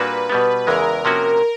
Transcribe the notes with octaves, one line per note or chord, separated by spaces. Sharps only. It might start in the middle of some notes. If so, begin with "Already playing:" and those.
Already playing: A#2 G3 A#3 D4 F#4 B4
B2 G3 B3
E2 C#3 E3 G#3 A#4
C3 F3 A#3 C#4 F#4